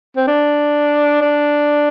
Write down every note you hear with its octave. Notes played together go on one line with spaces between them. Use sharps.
C4
D4
D4